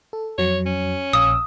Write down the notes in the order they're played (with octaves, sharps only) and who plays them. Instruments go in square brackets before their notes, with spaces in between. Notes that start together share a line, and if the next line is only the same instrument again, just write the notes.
[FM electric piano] A4
[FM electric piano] F2 F#3 [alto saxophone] C#5
[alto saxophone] C#4
[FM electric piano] A#1 F5 E6 [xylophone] D#6